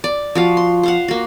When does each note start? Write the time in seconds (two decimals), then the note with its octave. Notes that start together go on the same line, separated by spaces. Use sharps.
0.04 D5
0.35 F3 F#4 F5
0.57 C6
0.83 C5 F5 F#5
1.08 A#3 F#4